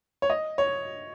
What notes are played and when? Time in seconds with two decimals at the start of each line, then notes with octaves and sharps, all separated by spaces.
0.22 C#5
0.30 D#5
0.58 C#5